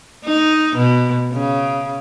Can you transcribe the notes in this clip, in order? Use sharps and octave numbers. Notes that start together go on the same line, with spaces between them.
D#4
B2
C#3